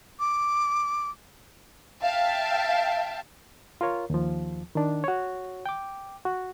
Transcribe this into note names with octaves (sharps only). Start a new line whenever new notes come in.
D6
E5 F5 G5 A5
F4 A#4 C#5
D#2 F3
D#3 D4
F#4 C#5
G5 D6
F#4